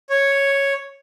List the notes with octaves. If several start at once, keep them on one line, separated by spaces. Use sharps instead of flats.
C#5